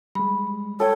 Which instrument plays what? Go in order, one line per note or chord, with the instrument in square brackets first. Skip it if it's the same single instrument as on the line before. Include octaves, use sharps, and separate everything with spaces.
[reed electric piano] G3 G#3 [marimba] B5
[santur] A4 G5 [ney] C#5